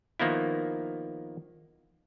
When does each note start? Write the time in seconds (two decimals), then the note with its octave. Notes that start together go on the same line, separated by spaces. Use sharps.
0.20 D#3 F3 A#3 B3 E4